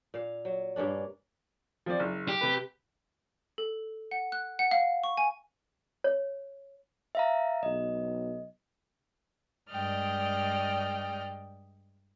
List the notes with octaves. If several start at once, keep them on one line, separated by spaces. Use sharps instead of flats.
A#2 F5
F#3
G2 A#3 C#4 D4
F3 C4 D5
F#1
G4
C3 B4
A4
F#5
F#6
F#5
F5
C#6
G#5
C#5
E5 F5 A#5
B1 D#5
G2 G#3 D5 D#5 G5 F6